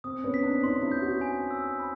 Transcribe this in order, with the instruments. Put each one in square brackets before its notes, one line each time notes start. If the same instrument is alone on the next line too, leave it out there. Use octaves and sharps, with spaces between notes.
[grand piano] C4 [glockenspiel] D#6
[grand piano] B3 C#4
[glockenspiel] B6
[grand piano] C4 D4
[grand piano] C#4 D#4 [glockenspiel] C6
[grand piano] D4 E4
[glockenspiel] G6
[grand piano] E4 F#4
[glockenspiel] G#5
E6
B5